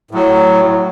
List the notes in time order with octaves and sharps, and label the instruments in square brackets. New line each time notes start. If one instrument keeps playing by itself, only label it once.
[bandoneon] A2 F#3